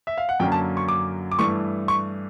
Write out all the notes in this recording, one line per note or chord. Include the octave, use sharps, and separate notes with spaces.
E5
F5
F#5
F#2 D3 F#3 A#3 C#4 G5
A5
C#6
D6
D6
G2 E3 A3 C#6
C#6